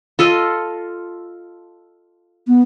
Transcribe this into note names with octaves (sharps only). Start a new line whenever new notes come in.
F4 A4 D#5
B3